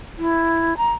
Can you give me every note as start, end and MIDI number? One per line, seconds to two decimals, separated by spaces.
0.19 0.77 64
0.77 0.91 82